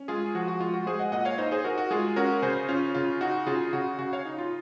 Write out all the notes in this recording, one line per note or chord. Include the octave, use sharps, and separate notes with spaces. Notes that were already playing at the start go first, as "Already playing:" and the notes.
Already playing: C#4
G#3 F4 G#4
F3 F#4
F#4
G#3 F4
F#4
G#3 G#4 C5
D#5 F#5
A#2 D#5 F#5
C#5 F5
D#4 C5 D#5
G#4 C5
D#4 F#4 A#4
F#4
G#3 F4 G#4
C#4 F#4 A#4
C#3 G#4 C5
C#4 F4
C#3 F4
D#4 F#4
C#3 F4 G#4
C#3 F#4
C#3 F#4
C#5 F5
D#4
F4